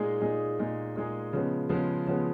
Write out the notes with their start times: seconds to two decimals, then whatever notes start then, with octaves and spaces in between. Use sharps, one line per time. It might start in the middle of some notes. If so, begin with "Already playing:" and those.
Already playing: A#2 G#3 D#4 G#4
0.21 A#2 G#3 D#4 G#4
0.59 A#2 G#3 D#4 G#4
0.96 A#2 G#3 D#4 G#4
1.33 C#3 F3 G#3 B3
1.69 C#3 F3 G#3 B3
2.06 C#3 F3 G#3 B3